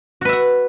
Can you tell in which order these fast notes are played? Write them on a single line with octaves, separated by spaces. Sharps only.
F#4 B4 E5 F#5